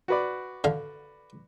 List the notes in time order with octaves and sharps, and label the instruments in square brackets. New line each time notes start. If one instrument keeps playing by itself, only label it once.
[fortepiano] F#4 B4 D5
[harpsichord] D3 F5